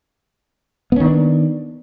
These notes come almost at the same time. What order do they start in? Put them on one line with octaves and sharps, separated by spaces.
B3 C#4 D#3 D4